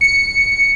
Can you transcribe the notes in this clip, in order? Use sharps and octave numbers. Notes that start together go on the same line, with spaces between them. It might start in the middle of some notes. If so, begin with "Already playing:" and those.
C#7